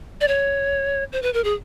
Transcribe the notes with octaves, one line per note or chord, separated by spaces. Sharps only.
D5
C#5
C5
B4
A#4
G#4